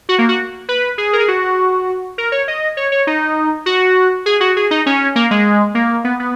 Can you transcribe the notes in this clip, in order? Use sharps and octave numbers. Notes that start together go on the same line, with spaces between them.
F#4
A#3
F#4
B4
G#4
A#4
G#4
F#4
A#4
C#5
D#5
C#5
C#5
D#4
F#4
G#4
F#4
G#4
D#4
C#4
A#3
G#3
A#3
B3
B3